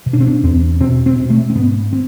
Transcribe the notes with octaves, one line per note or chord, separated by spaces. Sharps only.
B2
D4
C4
D4
E2 C4
B2 C4
C4
B2
A3
C4
G#2 B3
C4